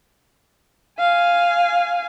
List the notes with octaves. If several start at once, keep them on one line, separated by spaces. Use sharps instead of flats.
F5 G#5